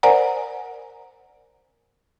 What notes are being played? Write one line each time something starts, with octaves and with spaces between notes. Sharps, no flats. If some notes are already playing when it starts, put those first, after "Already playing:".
A#4 C5 D5 F#5 G#5 A#5